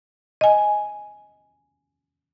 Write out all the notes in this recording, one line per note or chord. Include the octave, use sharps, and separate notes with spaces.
D#5 G#5